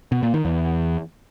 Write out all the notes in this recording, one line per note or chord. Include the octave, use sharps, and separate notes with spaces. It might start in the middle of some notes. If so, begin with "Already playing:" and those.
B2
A#2
D#3
E2